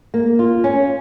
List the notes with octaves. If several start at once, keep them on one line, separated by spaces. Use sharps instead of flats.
A#3
F4
C#4